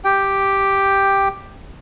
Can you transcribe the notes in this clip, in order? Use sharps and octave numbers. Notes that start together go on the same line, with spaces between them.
G4 G5